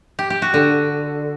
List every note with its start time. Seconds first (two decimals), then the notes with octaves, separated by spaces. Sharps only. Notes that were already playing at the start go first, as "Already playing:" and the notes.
0.19 G4
0.30 G4
0.42 F#4
0.54 D3